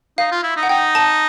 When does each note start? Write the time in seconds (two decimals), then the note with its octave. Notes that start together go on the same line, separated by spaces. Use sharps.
0.18 D#4 F5
0.32 F4
0.43 E4
0.56 D#4
0.63 F#5
0.69 D#4 G5
0.95 A5